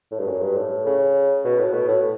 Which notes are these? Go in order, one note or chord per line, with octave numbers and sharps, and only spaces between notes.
A2
G2
F#2
G2
A2
C#3
B2
A2
B2
A2